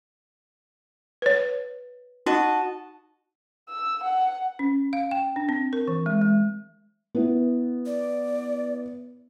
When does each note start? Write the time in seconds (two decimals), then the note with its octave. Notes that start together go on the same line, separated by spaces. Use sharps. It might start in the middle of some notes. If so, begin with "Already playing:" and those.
1.22 B4 C#5
2.26 D#4 F#4 D#5 A5
3.69 E6
4.04 F#5
4.59 C#4
4.93 F5
5.11 G5
5.36 D4
5.49 C4
5.73 A#4
5.88 E3
6.06 G#3
6.21 G#3
7.15 B3 E4
7.86 D5